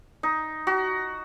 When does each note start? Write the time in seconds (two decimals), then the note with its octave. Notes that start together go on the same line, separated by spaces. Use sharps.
0.23 D#4
0.67 F#4